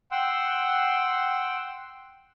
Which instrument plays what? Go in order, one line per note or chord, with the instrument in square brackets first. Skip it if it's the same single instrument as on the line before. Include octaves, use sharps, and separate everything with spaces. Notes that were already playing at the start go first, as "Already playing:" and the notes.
[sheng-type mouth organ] F#5 G5 C6 E6